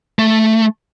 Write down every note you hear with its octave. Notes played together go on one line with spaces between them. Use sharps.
A3